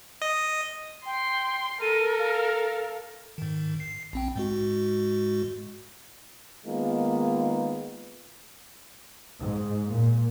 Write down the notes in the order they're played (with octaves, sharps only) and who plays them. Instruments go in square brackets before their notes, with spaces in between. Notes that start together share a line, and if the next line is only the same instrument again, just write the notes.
[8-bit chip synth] D#5
[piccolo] G5 [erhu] C6
[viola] A4 [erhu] A#4 [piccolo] D#7
[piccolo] F5
[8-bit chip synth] G#2 D#3
C7
A#1 C4 G5
G#2 G#3 F#4
[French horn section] D#3 G#3 A#3 B3 D#4 F4
[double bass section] G#2
A#2